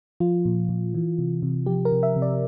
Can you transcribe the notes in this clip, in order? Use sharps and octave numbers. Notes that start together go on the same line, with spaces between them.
F3 F4
A#2
A#2
E3
C3
C3
F3 G4
A#4
C3
E5
C3
D5